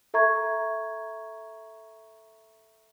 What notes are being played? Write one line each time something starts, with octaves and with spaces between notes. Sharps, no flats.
A4 E5 A#5 C#6 G#6